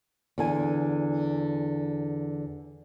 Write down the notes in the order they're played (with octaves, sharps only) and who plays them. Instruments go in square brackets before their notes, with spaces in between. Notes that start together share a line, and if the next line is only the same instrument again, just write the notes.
[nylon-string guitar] E2 D3 G#5